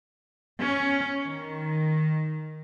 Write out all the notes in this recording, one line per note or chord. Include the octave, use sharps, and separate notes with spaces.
C#4
D#3